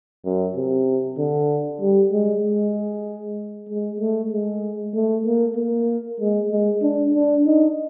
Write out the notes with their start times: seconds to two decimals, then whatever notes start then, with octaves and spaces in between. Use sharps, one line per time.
0.25 F#2
0.56 C3
1.18 D3
1.81 G3
2.12 G#3
2.43 G#3
3.69 G#3
4.00 A3
4.32 G#3
4.95 A3
5.26 A#3
5.57 A#3
6.20 G#3
6.51 G#3
6.82 D4
7.14 D4
7.46 D#4